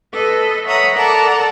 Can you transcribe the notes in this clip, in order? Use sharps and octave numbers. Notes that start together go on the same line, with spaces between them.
A4 B4 D#5
C#5 E5 F#5 A#5 B5 D#6
A4 A#4 D5 F#5 A5 A#5